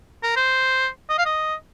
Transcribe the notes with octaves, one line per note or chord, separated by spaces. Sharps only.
A#4
C5
D#5
F5
D#5